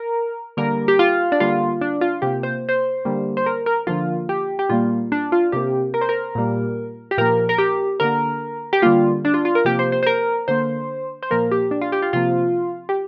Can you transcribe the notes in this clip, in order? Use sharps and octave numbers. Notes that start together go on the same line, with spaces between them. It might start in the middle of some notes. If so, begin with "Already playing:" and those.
Already playing: A#4
D3 G3 A#3 A#4
G4
F4
D4
D3 G3 A#3 F4
D4
F4
C3 A#3 G4
C5
C5
D3 G3 A#3
C5
A#4
A#4
D3 F3 A#3 F4
G4
G4
A#2 G3 A#3 F4
D4
F4
C3 A#3 G4
A#4
C5
A#4
A#2 G3 A#3
G4
A#2 F3 A#3 A#4
A#4
G4
D3 A#3 A#4
G4
D3 G3 A#3 F4
D4
F4
F4
A#4
C3 F3 A#3 G4
C5
C5
C5
A#4
D3 A#3 C5
C5
A#2 F3 A#3 A#4
G4
D4
F4
G4
F4
C3 F3 A#3 F4
G4